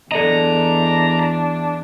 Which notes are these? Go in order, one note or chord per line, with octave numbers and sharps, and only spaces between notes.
E2 D4 A4 D5 D#5 A#5